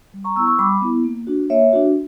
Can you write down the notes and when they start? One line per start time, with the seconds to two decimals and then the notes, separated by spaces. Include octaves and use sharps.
0.14 G3
0.24 A#5 C#6
0.36 B3 C#6 E6
0.39 E4
0.47 C#6 E6
0.59 G3 B5 D6
0.82 B3 E4
1.04 A#3
1.27 D4 F#4
1.50 A#3 C#5 E5
1.73 D4 F#4